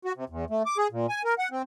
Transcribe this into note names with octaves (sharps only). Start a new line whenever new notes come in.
F#4
C3
E2
A3
D6
G#4
A#2
G#5
A#4
F#5
C4